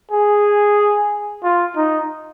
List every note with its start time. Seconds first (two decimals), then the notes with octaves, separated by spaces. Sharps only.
0.11 G#4
1.44 F4
1.76 D#4